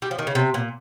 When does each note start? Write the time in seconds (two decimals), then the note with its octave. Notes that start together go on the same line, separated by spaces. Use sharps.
0.02 G3
0.11 F3
0.19 D#3
0.27 C#3
0.35 C3
0.54 A#2